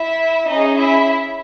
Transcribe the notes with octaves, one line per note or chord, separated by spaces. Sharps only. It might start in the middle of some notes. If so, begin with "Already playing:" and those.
Already playing: E4 E5
C#4 D#4 G#4 D#5
E4 E5